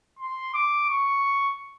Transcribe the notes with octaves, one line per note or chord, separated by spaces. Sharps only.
C6
D6
C#6